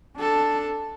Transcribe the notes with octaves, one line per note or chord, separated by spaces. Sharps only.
D4 A4